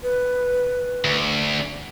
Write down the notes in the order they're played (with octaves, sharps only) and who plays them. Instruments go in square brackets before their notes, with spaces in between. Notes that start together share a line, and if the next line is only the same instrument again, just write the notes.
[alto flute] B4
[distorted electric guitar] D2